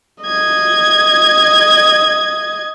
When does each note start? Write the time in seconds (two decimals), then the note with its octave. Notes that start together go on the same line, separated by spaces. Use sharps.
0.22 D#5 G#6